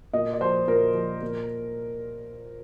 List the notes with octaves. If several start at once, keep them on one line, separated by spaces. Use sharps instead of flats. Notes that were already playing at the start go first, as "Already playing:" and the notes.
A#2 D#5
D5
F3 C5
A#2 A#4
F3
A#2